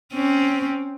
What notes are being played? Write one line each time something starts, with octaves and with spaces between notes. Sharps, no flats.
C4 C#4